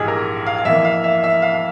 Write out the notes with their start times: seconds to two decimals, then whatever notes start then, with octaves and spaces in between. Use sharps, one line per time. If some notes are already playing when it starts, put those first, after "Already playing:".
Already playing: A#1 G#2 E3 G#3 G4 G#4
0.08 A#4
0.46 F5
0.58 F5
0.65 F2 E3 A#3 E5
0.85 F5
1.04 E5
1.24 E5
1.42 F5
1.54 F5